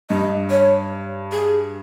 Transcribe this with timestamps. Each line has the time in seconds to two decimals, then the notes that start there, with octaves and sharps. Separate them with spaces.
0.10 G2 D#5
0.51 C#5
1.32 G#4